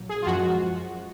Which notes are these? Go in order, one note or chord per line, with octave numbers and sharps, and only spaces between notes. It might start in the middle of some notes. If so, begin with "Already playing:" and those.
Already playing: A#1 A#2 F#3
G#4
F4
F#2 F3 G#3 F#4